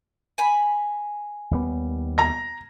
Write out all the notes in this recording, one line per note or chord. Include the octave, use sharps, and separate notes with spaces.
G#5 B5
D#2 G3 B3
A#5 A#6